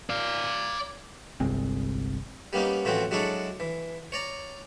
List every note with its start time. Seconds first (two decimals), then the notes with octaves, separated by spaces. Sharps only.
0.10 D5 F5
1.40 G1 C2 G#3 C4
2.53 G3 A#3 B3 C#4 D#4
2.85 A2 E3 F3 C4 C#4 F#4
3.11 F#3 G#3 D4 E4 A4 C#5
3.60 E3
4.12 C#5 D5 A#5